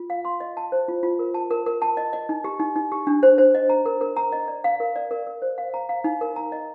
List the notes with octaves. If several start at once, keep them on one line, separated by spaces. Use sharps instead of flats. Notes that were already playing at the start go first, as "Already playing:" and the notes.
Already playing: F4
F5
C6
D#5
A5
C5
F4
F4
A#4
A5
A#4
A#4
A5
D#5
D#5
D#4
G4
D#4
D#4
G4
D4
C5
C5
D#5
A#5
A#4
A#4
A#5
D#5
D5
F5
A#4
D5
A#4
A#4
C5
F5
A#5
F5
D#4
A#4
A#5
D#5